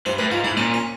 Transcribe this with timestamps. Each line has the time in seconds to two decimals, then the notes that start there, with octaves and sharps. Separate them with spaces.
0.06 G2 C5
0.18 A2 B4
0.31 G#2 F4
0.44 G#2 E4
0.57 A#2 C#4
0.74 C#4